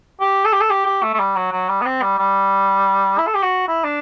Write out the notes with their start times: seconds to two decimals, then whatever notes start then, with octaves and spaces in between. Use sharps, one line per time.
0.21 G4
0.45 A4
0.53 G4
0.61 A4
0.71 G4
0.86 G4
1.03 A3
1.14 A3
1.20 G3
1.36 F#3
1.53 F#3
1.69 G3
1.82 B3
1.86 C4
2.02 G3
2.19 G3
3.19 E4
3.27 A4
3.35 G4
3.43 F#4
3.68 E4
3.85 D4